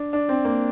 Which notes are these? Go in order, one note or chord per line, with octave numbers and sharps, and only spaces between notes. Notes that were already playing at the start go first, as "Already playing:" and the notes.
Already playing: D4
D4
C4
A#3